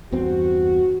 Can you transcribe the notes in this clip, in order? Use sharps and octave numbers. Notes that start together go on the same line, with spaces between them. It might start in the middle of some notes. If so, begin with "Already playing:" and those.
E2 G2 C4 F#4